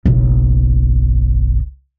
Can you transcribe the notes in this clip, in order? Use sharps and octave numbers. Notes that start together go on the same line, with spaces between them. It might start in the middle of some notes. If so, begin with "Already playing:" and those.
F#1 B1